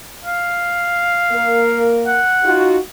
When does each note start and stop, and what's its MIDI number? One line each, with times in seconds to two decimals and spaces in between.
0.24 1.92 77
1.32 2.18 58
1.32 2.18 70
2.07 2.64 78
2.44 2.78 63
2.44 2.78 65
2.44 2.78 66